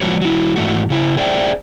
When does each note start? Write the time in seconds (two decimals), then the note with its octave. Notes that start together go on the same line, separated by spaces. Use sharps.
0.01 F3 G#3 F#4 B4 C#5
0.21 F#3 E4
0.56 G#2 E3 A3 F#4
0.90 C#3 E4
1.17 G#4 C5 D5 E5 G5